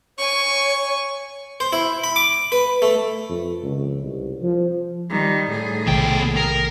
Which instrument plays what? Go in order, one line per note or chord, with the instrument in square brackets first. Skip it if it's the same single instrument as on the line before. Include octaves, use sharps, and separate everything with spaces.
[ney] C#5 [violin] G#5 C#6
[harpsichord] C5
E4
B5
D6
B4
A3
[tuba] F2
C#2
C2
F3
[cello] D#3 G3
A2 G#4
[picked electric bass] B1 C3 D#3 [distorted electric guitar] B3 G5
[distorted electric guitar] A#4